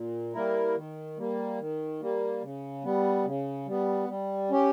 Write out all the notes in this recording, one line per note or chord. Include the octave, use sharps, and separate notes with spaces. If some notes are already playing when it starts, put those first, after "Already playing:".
Already playing: A#2
G3 A#3 E4 A#4
D#3
G3 A#3
D#3
G3 A#3
C#3
G3 B3
C#3
G3 B3
G3
C#4 G4